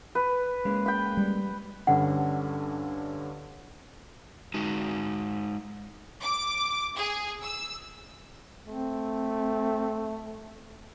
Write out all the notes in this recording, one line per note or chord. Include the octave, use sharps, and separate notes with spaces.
B4
G#3 A#3 C#4
G5 B5
G3
G2 D3 C#4 F#5
G#3 D#4 F#4
D6
G#4
E6
A3 C4